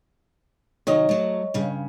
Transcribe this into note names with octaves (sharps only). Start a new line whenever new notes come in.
C3 D#3 F#3 C#5 D#5
F#3 A3
G2 C#3